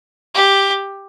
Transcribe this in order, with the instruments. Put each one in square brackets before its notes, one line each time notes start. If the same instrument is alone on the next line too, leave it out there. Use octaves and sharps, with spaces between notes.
[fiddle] G4